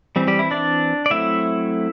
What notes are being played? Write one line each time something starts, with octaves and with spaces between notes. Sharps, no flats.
E3 G3 C4
G3 G4
E4
D4 D5
D5
F#3 A3 C4 E4 E5